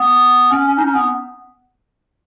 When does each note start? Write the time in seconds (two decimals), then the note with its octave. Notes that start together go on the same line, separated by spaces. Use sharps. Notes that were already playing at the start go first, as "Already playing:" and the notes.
Already playing: B3
0.51 C#4
0.67 C#4
0.78 D#4
0.84 C#4
0.95 B3